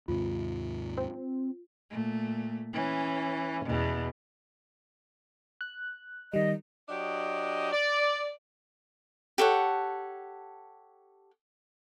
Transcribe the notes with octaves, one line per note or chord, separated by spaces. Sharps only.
D#2 G#2 C3 F4
C4
A#2 A3
E3 C#4
E2 B2
F#6
D#3 G3 D#5
F#3 D4 G4 D#5
D5
G4 A4 C#5 F#5